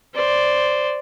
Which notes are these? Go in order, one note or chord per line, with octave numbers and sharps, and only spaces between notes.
C5 D5